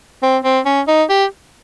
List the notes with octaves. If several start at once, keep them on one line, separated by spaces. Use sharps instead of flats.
C4
C4
C#4
D#4
G4